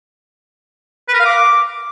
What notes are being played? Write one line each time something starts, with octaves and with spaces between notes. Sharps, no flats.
B4
A#4
F5
D6